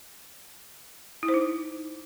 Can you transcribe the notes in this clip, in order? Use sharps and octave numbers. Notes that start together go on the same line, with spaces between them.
E4
C5
D#4